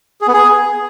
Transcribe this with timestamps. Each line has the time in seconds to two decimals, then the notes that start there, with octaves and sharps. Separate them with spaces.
0.21 G#4
0.27 B3
0.34 G#4